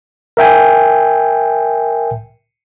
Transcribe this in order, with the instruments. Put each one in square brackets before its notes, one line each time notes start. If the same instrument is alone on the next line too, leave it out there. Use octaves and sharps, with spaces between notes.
[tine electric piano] A#4 E5 G5 G#5